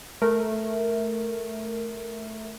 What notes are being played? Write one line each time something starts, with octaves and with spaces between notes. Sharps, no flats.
A3 A#4